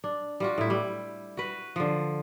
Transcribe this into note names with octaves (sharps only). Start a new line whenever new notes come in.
D4
G3 F4 F#4
A2 E4
G3
F#4 B4
D3 F3